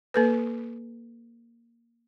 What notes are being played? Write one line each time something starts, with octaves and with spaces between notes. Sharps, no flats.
A#3 A4 B4